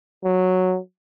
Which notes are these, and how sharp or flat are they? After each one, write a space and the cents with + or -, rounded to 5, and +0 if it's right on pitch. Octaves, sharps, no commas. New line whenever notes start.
F#3 -5